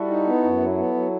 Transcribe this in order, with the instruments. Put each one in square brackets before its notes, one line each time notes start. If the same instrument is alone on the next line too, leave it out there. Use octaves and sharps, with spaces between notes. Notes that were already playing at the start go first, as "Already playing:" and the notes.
Already playing: [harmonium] G3 [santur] E4 F#4 A4
[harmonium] D#4
B3
F#2
F#3
B3
F#3